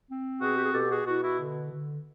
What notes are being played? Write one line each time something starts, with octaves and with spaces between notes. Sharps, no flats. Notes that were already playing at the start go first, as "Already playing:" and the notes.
C4
B2 F#4 G#4
G4
G#4
B2 G4 A4
F#4 G#4
B2 E4 F#4
E4 F#4
D3
D3